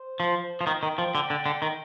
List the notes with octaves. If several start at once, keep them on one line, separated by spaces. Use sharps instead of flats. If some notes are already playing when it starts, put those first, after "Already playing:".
Already playing: C5
F3
F3
D#3 G5
D#3
F3
D3
D3
D3
D#3